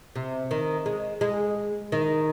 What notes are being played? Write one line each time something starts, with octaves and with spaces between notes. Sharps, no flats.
C3
D#3
G#3
G#3
D#3